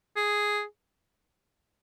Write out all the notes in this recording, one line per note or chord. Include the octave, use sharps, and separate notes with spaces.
G#4